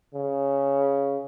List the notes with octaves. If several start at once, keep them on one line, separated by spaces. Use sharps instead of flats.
C#3